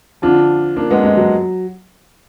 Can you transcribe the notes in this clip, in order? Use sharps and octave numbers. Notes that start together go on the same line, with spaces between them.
F2 D3 D4 F4
A#3 D4
G#3 B3
G#3
F#3